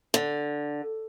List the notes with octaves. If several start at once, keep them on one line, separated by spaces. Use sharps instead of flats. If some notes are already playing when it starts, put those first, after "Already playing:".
D3